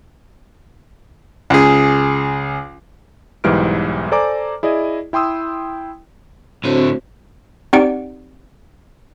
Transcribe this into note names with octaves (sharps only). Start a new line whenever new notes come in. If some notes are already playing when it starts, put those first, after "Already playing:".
C#2 G#4
B1 G#2 E3 G3 F6 D7
A4 C5 D5 G#5 A#5 D6
E4 G#4 D5 D#5
E4 G5 C6 D#6 E6
A2 D3 C4 F#4 C5
C4 D#4 G4 D5 F#5 D7